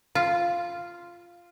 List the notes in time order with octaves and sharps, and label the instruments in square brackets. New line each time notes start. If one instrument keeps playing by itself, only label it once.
[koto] F4